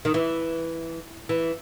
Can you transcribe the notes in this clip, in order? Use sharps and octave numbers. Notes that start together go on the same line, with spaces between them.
D#3
E3
E3